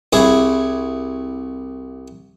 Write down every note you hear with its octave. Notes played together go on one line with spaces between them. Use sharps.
C2 E4 G#4 C#5